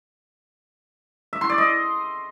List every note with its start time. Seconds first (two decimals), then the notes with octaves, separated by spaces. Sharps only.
1.33 E5
1.41 C6
1.50 D5
1.58 D#5